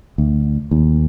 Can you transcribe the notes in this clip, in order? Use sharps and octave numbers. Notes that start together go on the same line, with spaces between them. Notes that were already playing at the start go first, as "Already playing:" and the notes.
D2
D#2